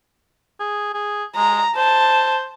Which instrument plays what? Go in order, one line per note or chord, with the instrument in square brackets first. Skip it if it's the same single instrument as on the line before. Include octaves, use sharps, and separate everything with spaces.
[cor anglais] G#4
G#4
[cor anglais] G#3 [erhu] A#5
[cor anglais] C5 [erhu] A5